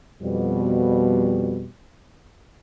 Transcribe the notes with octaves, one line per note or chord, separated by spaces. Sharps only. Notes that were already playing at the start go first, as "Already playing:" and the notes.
F2 B2 G3